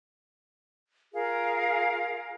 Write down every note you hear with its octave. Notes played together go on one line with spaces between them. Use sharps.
F4 G#4 A#4 F5